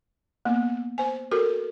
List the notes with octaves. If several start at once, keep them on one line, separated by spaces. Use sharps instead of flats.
A#3 B3
C5 G#5
F#4 A4 A#4